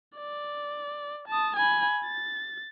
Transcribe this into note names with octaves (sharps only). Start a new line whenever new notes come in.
D5
A5 D#6
G#5 B5
A6